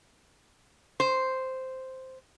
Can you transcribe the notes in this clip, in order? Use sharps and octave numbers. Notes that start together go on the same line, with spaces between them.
C5